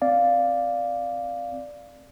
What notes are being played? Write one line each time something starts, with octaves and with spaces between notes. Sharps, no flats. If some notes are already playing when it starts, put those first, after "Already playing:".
C4 D5 F5